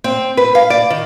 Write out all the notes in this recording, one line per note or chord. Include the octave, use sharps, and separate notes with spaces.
C4
B4
F5
D5
D#3